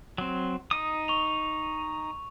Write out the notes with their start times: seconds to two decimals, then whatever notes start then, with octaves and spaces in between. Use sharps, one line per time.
0.18 F#3 C4
0.71 D#4 D#6 D#7
1.08 C#6 F7